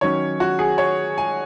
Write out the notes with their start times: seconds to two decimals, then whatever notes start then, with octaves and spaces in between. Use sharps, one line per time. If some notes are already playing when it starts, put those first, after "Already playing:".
0.01 D#3 F#3 C#4 C#5
0.40 F#4
0.59 G#4
0.78 C#5
1.18 G#5